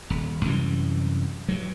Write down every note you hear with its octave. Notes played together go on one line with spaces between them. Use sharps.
D#1
C2 F#2 E3 G3
G2 F#3